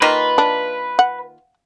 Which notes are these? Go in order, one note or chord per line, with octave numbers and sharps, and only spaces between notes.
D#3 A#3 F4 B4
D4
F#5